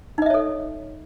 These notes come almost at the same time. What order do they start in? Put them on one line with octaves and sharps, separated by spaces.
D#4 D#5 E5 C#5 A4